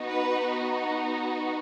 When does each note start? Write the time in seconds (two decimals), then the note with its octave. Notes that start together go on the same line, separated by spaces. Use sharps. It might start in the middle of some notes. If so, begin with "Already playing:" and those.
Already playing: B3 D#4 F#4
0.10 B4